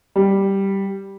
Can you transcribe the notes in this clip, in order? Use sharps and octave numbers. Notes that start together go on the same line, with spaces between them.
G3